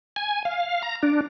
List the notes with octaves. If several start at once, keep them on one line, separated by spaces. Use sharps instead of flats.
G#5
F5
A#5
D4